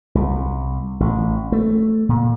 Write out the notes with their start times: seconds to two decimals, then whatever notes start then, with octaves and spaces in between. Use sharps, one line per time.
0.15 C2
1.00 A1
1.52 A3
2.09 A#2